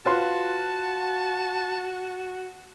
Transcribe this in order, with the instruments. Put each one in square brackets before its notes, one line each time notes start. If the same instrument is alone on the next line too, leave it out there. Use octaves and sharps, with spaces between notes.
[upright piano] F4 B4 C6 [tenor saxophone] F#4 [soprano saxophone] A5